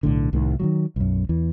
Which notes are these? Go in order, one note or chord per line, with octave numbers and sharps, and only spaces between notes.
B1 A2 D3
C2 A2 D#3
D#3 F3 F#3
B1 F#2
E2 E3